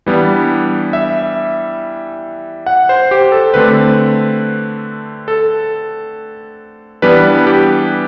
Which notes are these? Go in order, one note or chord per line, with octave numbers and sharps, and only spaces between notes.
E3 G3 B3 D4
E5
F#5
C5
G4
A4
D3 A3 C4 B4
A4
E3 G3 B3 D4 B4
G4